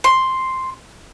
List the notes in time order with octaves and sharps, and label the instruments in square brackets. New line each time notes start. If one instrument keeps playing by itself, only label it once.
[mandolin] C6